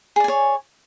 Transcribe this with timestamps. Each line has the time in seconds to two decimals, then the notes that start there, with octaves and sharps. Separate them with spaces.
0.16 G#4
0.20 D5
0.24 G#5
0.28 C#5